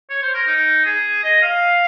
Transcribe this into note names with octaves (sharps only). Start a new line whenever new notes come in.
C#5
C5
A#4
D#4
G#4
D#5
F5